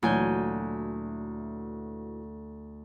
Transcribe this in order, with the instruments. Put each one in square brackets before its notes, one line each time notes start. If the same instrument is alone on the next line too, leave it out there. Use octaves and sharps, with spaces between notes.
[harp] D2 G#5 G6 [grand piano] A#2 E3 F#3